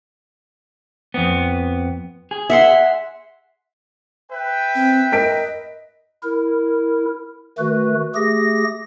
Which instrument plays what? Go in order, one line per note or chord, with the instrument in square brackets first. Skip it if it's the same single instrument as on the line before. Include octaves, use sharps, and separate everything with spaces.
[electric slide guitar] F2 B3
G#4
[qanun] E5 F#5 C6
[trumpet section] B4 E5 G5
[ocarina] C4
[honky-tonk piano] A#4 B6 D7 [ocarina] D#5
[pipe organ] E4 A#4
D#3 A3 F#4 B4
A3 G4 G#4 A#6